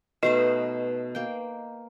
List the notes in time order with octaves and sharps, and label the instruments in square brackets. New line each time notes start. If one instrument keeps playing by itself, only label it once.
[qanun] B2 A3 D#4 [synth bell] B4 D#5
[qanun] A#3 G5